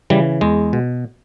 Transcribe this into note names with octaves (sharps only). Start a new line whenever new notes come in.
C#3 E3 G3
E2 G#3
B2